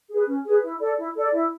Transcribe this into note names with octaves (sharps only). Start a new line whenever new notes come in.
G#4 B4
C#4
G#4 B4
E4
A4 D5
E4
A4 D5
E4